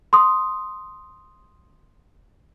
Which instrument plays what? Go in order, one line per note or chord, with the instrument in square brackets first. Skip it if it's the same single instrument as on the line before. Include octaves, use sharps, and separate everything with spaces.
[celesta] C6 D#6